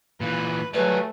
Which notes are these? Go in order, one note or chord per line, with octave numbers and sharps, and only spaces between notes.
A#2 E3 B4
F#3 G3 A3 G#4 B4